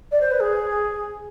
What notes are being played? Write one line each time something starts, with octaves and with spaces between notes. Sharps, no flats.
D5
C5
B4
G#4